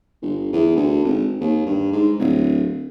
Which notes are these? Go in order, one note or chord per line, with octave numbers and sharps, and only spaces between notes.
G1
E2
D2
G#1
D#2
G2
G#2
D1